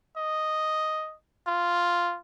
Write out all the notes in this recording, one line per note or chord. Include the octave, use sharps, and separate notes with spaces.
D#5
F4